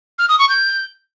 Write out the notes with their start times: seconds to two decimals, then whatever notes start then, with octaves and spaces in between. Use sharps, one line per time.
0.19 F6
0.29 D#6
0.39 C#6
0.49 G6